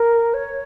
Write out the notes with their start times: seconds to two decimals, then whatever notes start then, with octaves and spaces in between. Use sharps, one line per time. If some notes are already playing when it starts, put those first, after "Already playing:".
Already playing: A#4
0.34 C#5